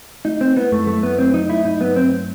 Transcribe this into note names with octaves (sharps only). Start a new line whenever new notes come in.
A3 D#4
A3 C4
B3 E4
F#2 A3
F#3 A3
A3 B3
F#3 C4
F#3 D#4
A3 E4
G2 D#4
F#3 B3
F#3 C4